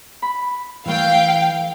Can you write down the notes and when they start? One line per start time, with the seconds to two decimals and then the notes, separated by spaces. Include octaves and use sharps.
0.22 B5
0.86 E3 A3 F5 G5